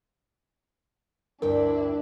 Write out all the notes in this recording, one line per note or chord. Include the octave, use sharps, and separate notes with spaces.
D2 G2 D4 E4 A#4 G5